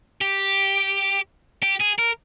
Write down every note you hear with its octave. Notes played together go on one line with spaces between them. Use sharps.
G4
G4
G#4
A#4